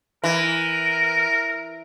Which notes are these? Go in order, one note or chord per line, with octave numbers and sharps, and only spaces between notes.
E3 A#4